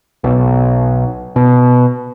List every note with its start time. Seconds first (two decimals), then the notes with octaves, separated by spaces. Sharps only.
0.24 B1
1.36 B2